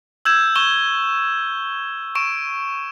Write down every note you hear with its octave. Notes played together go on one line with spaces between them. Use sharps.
E6 G6 G#6 E7
C#6 E7 G7
C#6 D7 E7